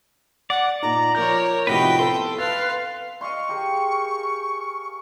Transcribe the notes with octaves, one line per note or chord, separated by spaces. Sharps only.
D5 F#5
A#2 D#4 A#5
F3 A#4 C#5 G6
A2 C3 F3 D#4 F#4 B4 G5 B5
B3 C4 A4 B4 C6
B4 F5 A6
D#5 F5 C6 C#6
G4 G#4 A#4